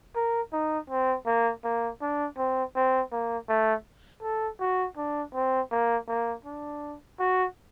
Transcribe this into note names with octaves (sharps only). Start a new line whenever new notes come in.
A#4
D#4
C4
A#3
A#3
D4
C4
C4
A#3
A3
A4
F#4
D4
C4
A#3
A#3
D4
F#4